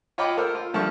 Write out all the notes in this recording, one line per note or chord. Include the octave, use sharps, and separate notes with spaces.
F4 C#5 D#5 G5 B5 D6
A4 A#4 C5
F4
A#2 D3 F3 G3 E5 C#6